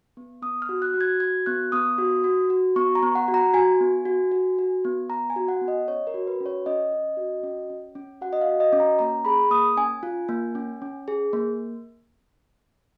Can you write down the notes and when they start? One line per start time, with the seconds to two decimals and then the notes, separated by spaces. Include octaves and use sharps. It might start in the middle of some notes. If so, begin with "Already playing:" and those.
0.17 B3
0.42 B3 D#6
0.62 F6
0.69 F#4
0.82 F#6
0.94 F#4
1.01 G#6
1.20 F#4 G#6
1.46 B3 F#6
1.72 B3 D#6
1.98 F#4
2.24 F#4
2.50 F#4
2.76 B3 C#6
2.95 A#5
3.03 B3
3.15 F#5
3.28 F#4
3.34 A#5
3.54 F#4 G#5
3.80 B3
4.05 F#4
4.32 F#4
4.59 F#4
4.85 B3
5.10 B3 A#5
5.30 G#5
5.36 F#4
5.48 F#5
5.61 B3
5.68 D#5
5.88 C#4 C#5
6.07 A#4
6.14 F#4
6.27 B4
6.40 C#4
6.46 C#5
6.66 C#4 D#5
6.92 C#4
7.17 F#4
7.43 C#4
7.70 C#4
7.95 C#4
8.21 F#4 F#5
8.33 D#5
8.41 F5
8.48 F#4
8.60 D#5
8.73 C#4
8.80 A#5
8.99 A#3 A#5
9.25 G#4 B5
9.51 A#3 D#6
9.77 C#4 G#5
10.03 F4
10.29 A#3
10.55 C#4
10.82 C#4
11.08 G#4
11.33 A#3